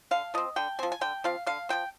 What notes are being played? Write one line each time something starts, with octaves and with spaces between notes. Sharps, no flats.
D3 F5
F3 C4 D#5
D3 G5
F3 C4 G#5
G#5
D3 G5
F3 C4 F5
D3 F5
F3 C4 G5